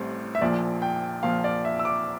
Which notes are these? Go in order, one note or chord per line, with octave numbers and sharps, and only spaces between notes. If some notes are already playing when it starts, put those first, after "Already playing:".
Already playing: A1 A2 G3 C4
E5
A#1 A#2 F3 D5
G5
A#1 A#2 F3 F5
D5
E5
E6
D6